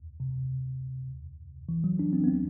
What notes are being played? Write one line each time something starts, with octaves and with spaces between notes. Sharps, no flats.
C3
E3
F#3
D4
C4
B3
C4